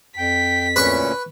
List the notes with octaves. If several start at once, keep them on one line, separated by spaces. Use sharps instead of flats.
F2 G5 B6
D2 A#2 C#4 B4 C#6